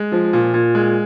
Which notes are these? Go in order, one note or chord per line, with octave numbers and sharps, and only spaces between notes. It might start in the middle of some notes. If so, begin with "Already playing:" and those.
Already playing: G#3
F3
A#2
A#2
G#3